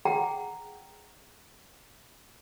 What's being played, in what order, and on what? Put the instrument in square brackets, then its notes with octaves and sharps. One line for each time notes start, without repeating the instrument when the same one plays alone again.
[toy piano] G#4 F#5 G5 A#5